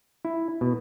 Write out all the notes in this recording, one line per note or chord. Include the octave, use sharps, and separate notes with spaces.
E4
B2